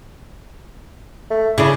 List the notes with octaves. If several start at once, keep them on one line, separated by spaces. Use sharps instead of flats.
A3
C#3 D4 E4